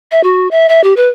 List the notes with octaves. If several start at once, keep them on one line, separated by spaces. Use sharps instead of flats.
E5
F#4
E5
E5
G4
B4